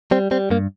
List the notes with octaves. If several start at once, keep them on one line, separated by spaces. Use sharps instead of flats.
G3 C4
G3 C4
G2 A#3